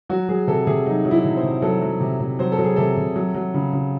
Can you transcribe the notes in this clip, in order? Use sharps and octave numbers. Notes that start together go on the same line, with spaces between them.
F#3 F#4
F#3 G#4
C3 A4
C3 G#4
F#3 D#4
F#3
E4
C3
C5
C3
F#3 A4
F#3
C3
C3
F#3 C5
A4
F#3
G#4
C3 A4
C3
F#3
F#3
C#3
C#3